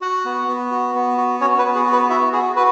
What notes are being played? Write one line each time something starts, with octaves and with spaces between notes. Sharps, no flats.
F#4 F#5
B3
B3
F#4
B3
F#4
C#4 F#4 C#5
B4
B3
G#4
F#4
B4
E4 F#4 E5
F#4 G#4
F#4 B4